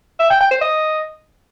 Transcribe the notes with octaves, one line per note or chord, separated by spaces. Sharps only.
E5
G5
G5
C5
D#5